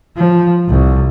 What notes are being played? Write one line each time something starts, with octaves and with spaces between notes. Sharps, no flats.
F3
C2